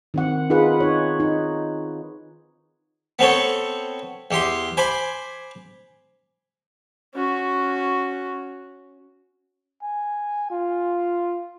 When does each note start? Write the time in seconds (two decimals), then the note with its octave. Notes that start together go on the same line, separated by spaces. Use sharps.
0.14 D#3 C4 F#5
0.50 D#4 F4 G#4 B4 F#5
0.80 D#4 C#5
1.20 D#4
3.19 B3 C4 A4 C#5
4.31 E2 G4 C6
4.77 C5 G#5 B5 D6
7.15 C#4 F#4
9.83 G#5
10.51 F4